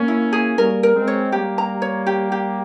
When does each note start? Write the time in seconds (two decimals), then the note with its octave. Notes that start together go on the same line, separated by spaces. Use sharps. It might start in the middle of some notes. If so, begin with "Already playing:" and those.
Already playing: A#3 C#4
0.08 E4
0.33 G#4
0.58 G3 A#3 A#4
0.83 A#4
0.96 G#3 C4
1.08 C#5
1.32 G3 A#3 G4
1.58 A#5
1.82 C#5
2.07 G4
2.32 G4